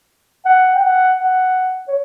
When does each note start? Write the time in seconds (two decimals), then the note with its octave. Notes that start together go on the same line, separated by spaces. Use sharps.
0.45 F#5
0.75 G5
0.83 F#5
1.20 F#5
1.88 C#5